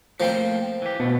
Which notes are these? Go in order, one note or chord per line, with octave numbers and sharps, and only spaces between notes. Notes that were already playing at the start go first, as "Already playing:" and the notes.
F3 A3 A#3 C4 G5
E3 G4
B2 D3 A3